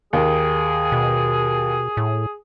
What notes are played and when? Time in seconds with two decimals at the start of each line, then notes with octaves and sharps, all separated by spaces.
0.13 D#2 G#4
0.92 B2
1.97 A2